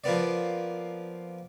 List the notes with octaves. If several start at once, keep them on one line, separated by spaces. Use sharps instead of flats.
F3 A#3 B3 D5